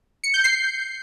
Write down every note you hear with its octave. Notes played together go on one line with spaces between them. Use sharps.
C#7
G6
C7